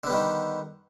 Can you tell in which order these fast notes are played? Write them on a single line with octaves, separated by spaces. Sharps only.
D3 B3 G3 D#3